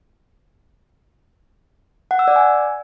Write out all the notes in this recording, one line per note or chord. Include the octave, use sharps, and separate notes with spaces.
F#5
E6
D5
G#5